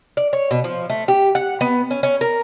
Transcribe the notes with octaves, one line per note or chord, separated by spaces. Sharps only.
D5
C#5
B2
F3
A3
G4
F#5
B3
C#4
C#4
A#4